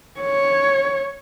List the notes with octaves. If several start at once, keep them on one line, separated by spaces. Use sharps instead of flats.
C#5